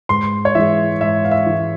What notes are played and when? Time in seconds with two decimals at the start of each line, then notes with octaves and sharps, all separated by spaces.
0.09 G#2 C6
0.45 C#5
0.55 E3 G#3 E5
1.01 G#2 E5
1.24 F5
1.31 E5
1.46 E3 G#3